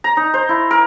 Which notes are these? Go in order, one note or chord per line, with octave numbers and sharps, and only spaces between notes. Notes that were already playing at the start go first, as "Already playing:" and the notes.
A#5
D#4
C5
E4
A#4